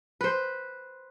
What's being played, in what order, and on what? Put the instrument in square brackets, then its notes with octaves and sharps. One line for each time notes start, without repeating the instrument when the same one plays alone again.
[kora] B4 C5